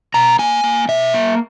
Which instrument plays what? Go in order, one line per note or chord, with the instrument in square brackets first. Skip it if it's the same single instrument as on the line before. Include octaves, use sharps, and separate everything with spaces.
[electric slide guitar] B2 A#5
A#3 G#5
A#3
B2 E5
A#3